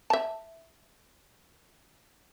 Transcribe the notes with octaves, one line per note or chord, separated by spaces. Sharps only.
E5 A5